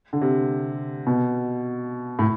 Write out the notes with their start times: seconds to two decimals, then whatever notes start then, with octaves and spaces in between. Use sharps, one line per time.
0.13 D3
0.21 C3
1.07 B2
2.19 A2